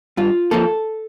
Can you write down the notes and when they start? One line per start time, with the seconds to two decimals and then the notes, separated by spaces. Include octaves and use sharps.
0.17 G2 F4
0.51 F3 A#3 A4